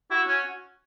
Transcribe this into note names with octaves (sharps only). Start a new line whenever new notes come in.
E4 F#4
C#4